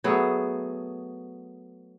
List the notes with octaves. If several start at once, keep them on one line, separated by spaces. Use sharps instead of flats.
F#3 A3 B3 G#4